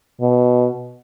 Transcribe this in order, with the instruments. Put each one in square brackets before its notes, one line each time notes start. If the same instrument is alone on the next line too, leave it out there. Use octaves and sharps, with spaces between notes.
[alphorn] B2